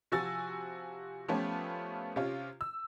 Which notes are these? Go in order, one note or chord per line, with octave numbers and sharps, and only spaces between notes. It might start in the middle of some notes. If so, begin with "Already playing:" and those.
C3 F3 F#4 G#5 E6 A6
F3 A3 B3 C#4 F4 G4
C3 C#4 F4
E6